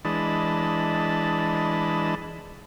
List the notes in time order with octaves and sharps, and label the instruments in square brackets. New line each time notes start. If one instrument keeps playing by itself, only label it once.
[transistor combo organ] E3 G#3 D4 D#5 A5 B5